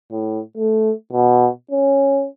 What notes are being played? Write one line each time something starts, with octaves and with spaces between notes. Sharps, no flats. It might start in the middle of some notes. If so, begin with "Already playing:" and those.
A2
A3
B2
C#4